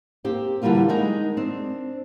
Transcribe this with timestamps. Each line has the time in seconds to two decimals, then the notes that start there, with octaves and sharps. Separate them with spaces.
0.24 A#3 C4 G4
0.62 D3 E3 G3 A#3 F4 G4
0.89 G#3 D#4 A#4 G#5
1.37 C4 D4